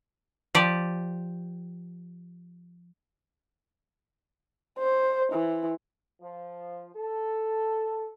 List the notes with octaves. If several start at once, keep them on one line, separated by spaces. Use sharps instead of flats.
F3 G4 D5
C5
E3
F3
A4